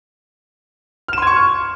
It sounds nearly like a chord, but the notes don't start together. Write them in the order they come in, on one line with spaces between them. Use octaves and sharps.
F6 E7 C6 G#6 C#6